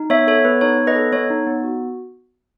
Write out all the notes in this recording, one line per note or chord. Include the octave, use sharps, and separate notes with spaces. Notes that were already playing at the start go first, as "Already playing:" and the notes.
Already playing: D#4
B3 C#5 E5
A4 C#5
B3 B4
D#4 C#5
B3
B4 D#5
A4
B3 C#5
D#4
B3
F#4